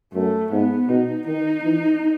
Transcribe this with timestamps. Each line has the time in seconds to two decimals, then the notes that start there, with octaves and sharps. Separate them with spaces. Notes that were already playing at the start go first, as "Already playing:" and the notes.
0.13 F#2 A3
0.51 G#2 B3
0.89 B2 D#4
1.27 D#3 D#4
1.64 E3